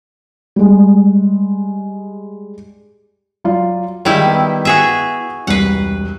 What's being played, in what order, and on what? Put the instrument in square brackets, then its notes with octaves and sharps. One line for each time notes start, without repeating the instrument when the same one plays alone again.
[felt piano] G3 G#3
F#3 F4 D5
[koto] D#3 G3 E4 [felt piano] G#3 F4
[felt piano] B3 G5
[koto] F#4 G#4 E5
[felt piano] E1 C2 C7 [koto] B4 F#5